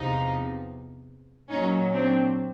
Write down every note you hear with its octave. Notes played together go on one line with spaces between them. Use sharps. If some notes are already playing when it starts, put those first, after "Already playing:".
Already playing: E2 C3 F3 D#4 F4
A#2 F#3 C#4 D#4
C4 D4